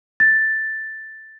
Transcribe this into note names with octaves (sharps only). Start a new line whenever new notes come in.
A6